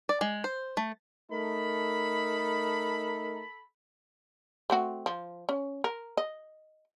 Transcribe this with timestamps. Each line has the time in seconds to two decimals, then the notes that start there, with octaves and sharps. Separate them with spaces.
0.09 D5
0.21 G#3
0.44 C5
0.77 A3
1.31 A3 D#4 A4 A#4 B5
4.70 A3 C4 F#4
5.06 F3
5.49 C#4
5.84 A#4
6.17 D#5